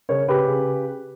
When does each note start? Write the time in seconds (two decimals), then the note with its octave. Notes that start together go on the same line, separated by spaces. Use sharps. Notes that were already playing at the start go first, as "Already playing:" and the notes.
0.09 C#3 A#4 C#5
0.28 C#3 G4 B4
0.48 C#3